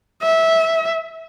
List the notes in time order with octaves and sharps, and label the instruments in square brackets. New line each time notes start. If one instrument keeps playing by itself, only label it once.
[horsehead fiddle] E5